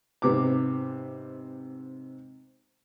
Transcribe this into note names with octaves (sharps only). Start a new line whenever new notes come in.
G#2 C3 B3 D6